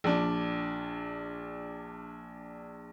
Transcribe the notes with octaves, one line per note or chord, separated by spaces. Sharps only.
A#1 D4